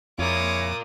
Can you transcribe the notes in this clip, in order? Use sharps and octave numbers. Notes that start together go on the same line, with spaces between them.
F2 G#3 E4 F4 A#4 C#5 D6 D#6